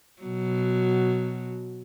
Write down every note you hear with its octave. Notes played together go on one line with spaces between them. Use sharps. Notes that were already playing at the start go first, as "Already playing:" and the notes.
B2 F#3